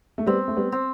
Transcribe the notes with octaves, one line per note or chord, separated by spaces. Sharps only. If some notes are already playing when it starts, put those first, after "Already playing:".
A3
G3 B3 C4
A3
G3 B3
C4